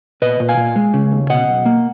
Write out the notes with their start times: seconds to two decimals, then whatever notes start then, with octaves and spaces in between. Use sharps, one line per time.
0.22 A#2 B4 D#5
0.40 A#2
0.49 F5 G#5
0.57 A#2
0.76 G#3
0.94 C#3
1.12 D#2
1.30 B2 D#5 F#5
1.48 B1
1.66 A#3